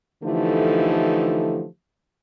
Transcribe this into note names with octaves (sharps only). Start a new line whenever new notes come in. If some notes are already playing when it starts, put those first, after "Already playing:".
D3 E3 F3 A3 D#4 G4